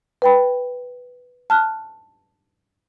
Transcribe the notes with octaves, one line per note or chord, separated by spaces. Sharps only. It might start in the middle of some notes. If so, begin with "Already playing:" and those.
B4 G5 B5
A5 F6 F#6